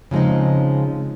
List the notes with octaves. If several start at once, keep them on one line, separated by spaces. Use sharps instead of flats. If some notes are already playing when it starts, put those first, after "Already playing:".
C#3 F3 G#3 C4 D#4